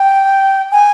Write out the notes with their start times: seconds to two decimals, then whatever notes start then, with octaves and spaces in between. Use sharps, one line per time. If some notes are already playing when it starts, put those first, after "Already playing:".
Already playing: G5
0.72 G#5